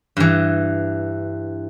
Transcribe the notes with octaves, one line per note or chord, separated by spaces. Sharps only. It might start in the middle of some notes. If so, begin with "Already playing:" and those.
G2 E3